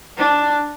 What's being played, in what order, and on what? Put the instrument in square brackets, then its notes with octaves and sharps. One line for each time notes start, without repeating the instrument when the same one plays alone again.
[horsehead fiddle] D4